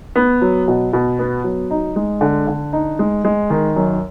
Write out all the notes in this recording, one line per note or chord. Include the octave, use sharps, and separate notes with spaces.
B3
F#3
B2
B2
B3
F#3
D#4
G#3
D3
D3
D#4
G#3
G#3
D#3
F#2